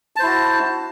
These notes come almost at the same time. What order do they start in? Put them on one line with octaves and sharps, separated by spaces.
A5 C5 E4 F#4